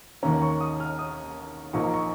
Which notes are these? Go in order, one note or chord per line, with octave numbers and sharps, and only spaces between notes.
D#2 D#3 A#3 C#4 A#5
C#6
D#6
F6
D#6
A#1 A#2 A#3 D#4 C#6
A#5
C#6